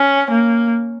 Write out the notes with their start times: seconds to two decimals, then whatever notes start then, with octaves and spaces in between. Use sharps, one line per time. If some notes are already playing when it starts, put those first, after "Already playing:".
Already playing: C#4
0.30 A#3